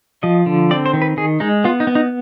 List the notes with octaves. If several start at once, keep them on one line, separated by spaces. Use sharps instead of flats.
F3 D#5
D3
C4 D5
C5
D#3
B4
D#3 G#4
G#3 D#4
B3 F4
D#4
B3
D#4